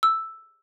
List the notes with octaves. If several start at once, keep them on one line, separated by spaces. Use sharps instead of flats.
E6